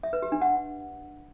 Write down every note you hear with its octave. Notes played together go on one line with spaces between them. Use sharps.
E5
B4
G4
D4
F#5